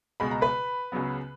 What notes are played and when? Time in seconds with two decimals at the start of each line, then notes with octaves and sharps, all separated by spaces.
0.20 C#2 B2 G#3 B5
0.31 A#5
0.41 B4 B5
0.92 C#2 C#3 F#3 B3